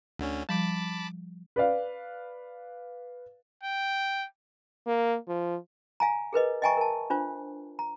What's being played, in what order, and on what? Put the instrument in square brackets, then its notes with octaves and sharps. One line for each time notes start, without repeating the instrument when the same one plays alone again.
[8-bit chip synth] D2 D3 C#4
[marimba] F3 G3 [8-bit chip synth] A5 B5 D6
[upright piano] B4 D5 F5
[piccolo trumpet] G5
[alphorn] A#3
F3
[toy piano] F5 G#5 A#5
G#4 A#4 B4 D#5
D#5 E5 G5 G#5 A#5 C#6
A#4 A5
D4 F4 C5
A#5